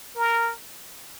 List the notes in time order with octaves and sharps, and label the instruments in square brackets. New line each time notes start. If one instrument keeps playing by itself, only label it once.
[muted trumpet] A#4